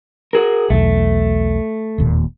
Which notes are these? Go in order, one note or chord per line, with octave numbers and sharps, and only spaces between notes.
F#4 G#4 A#4
B1 E2 A3
E1 D#2 A#2